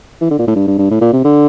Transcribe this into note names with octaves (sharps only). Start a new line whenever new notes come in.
E3
D3
A#2
A2
G2
G2
G2
A2
A#2
C3
D3